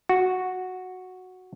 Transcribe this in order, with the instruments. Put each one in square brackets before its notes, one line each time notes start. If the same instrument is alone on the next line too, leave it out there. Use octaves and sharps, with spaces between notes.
[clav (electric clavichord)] F#4